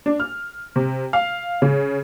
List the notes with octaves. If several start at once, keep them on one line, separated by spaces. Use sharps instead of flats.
D4
F6
C3
F5
C#3